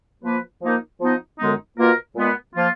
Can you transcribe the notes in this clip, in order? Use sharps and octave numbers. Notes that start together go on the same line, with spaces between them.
F3 A#3 F4 B4
F3 A#3 D#4 A#4
F3 B3 D#4
F#2 D3 G#3 B3 D#4
B2 A#3 F4 A#4
A#2 G#3 B3
F3 A#3 F4